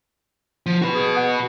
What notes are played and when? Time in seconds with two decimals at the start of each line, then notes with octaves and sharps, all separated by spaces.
0.66 F3
0.82 F#4 B4
0.95 G#4
1.16 F#5